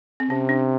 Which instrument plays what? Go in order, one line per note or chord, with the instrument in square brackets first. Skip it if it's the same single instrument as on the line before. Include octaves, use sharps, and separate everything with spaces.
[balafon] C4
[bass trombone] C3 [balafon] C#4
[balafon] D4